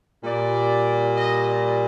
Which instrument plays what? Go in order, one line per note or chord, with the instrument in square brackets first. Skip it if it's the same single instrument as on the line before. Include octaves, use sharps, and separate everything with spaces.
[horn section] A#2 G3 D5
D#5
D5